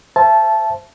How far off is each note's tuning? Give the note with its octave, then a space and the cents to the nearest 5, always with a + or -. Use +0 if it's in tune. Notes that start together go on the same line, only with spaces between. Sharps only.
C5 +0 E5 +25 A5 -15